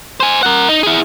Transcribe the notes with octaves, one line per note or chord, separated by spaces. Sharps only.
C5 G#5
A#4 F#5
D#4
E4 G#4